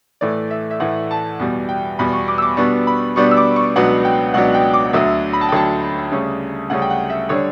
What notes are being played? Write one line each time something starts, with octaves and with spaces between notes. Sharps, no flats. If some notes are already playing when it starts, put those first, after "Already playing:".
A2 E3 A3 D5
E5
E5
A2 E3 A3 F#5
A5
E2 B2 G3
G5
E2 B2 G3 B5
C#6
D6
E6
D6
B2 G3 B3 D4 C#6
B5
B2 G3 B3 D4 C#6
E6
D6
C#6
C#2 B2 F#3 B3 D4 F#5
G5
C#2 B2 F#3 B3 D4 F#5
G5
D6
D2 D3 F#3 E5
B5
A5
G5
D2 D3 F#3 A5
D2 C#3 G3 C#4
D2 C#3 G3 C#4 F#5
G5
F#5
E5
D3 G3 D4 C#5